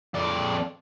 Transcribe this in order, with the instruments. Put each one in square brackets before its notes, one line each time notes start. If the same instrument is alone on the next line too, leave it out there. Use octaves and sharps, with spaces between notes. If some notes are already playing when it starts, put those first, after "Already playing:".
[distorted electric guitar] F2 D5